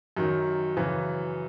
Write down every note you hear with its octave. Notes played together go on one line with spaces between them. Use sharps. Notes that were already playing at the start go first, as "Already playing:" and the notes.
F#2 D#3 F#3
F#2 C#3 E3